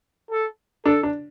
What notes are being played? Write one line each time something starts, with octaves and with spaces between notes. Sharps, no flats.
A4
D4 A4
D4